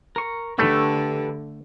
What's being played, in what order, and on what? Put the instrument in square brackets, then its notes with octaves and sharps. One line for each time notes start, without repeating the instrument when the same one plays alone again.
[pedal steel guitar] A#4 C#6
[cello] D3 [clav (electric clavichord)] A3 [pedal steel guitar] G4 A4 B4